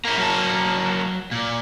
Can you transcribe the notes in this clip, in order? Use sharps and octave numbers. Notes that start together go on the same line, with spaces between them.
A#3 C#4 E5 A#5
F#3 A5
A#2